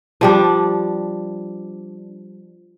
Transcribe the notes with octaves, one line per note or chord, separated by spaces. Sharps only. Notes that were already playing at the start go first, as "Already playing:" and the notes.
F3 G3 D4